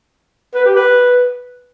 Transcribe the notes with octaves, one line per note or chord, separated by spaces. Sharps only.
B4
G4
B4